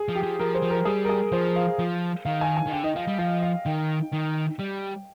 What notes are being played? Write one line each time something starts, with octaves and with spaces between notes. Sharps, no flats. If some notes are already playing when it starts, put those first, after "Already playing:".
Already playing: G#4
F3
G4
F3
F3 A#4
C5
F3
A#4
G3 G#4
A#4
G#4
F3 C5
F5
F3
D#3 F5
G#5
G#5
D#3
D3 G5
D#3 D#5
F3 F5
G3
F3 F5
F5
D#3 G5
D#3
G3